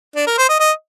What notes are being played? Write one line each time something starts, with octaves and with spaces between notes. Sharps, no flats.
D4
A#4
C5
D#5
D#5